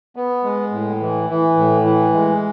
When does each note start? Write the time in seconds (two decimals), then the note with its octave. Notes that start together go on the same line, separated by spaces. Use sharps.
0.16 B3
0.44 G#3
0.72 A2
1.00 E3
1.29 E3
1.57 A2
1.85 E3
2.14 G#3